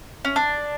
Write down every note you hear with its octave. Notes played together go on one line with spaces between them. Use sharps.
C#4
D4